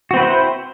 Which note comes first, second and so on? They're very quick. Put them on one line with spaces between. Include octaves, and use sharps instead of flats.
F#4 C4 B4 E4 C5